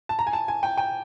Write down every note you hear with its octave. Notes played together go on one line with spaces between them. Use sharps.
A5
A#5
G#5
A5
G#5
G5
G5